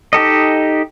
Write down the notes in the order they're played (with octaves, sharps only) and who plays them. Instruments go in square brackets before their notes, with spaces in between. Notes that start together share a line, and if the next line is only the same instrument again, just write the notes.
[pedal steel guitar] D#4 G4 A4 D#5